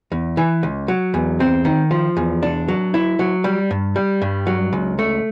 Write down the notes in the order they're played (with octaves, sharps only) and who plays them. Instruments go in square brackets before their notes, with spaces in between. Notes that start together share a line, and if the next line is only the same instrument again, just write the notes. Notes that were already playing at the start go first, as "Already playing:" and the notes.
[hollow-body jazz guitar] E2
E3
C#2
F#3
E2
C4
D#3
F3
E2
D4
F#3
E4
F#3
G3
G2
G3
G2
F#3
C#2
A3